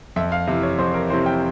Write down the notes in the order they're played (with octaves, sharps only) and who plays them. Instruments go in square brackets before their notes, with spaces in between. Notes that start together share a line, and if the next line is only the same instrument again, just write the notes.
[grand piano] F2 [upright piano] E5
[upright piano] F5
[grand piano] C3 E3 [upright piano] E5
[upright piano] C#5
[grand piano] F2 [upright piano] C5
[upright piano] A#4
[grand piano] E3 [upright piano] C5
[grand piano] C3
[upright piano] G5